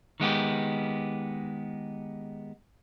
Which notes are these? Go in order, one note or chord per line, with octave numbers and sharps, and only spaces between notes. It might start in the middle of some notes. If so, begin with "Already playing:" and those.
D#3 G#3 B3 G4